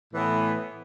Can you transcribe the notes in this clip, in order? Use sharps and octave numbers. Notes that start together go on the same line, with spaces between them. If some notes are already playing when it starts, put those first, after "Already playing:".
A2 E3 B3